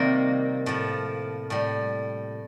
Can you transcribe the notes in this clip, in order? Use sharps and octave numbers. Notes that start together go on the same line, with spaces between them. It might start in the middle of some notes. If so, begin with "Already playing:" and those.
Already playing: C3 D#3 G3 A#3
A2 F3
A2 G3